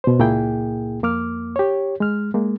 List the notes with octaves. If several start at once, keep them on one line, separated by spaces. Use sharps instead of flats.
B2 C5
C#2 A#2 A#3 E4 G#4 G5
F2 A#3 D6 F6
G4 C#5
G#3 F6
G#3 A#3